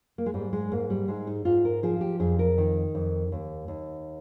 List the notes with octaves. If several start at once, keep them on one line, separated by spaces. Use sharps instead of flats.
A#3
G#3
G#2 G3
G#3
G#2 A#3
G3
G#2 G#3
D#4
G#2 F4
A#4
F3 G#4
F4
G4
F2 G#4
A#4
D#3
F2
D#2
D#2